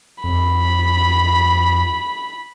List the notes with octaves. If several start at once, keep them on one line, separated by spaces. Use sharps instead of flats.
F2 B5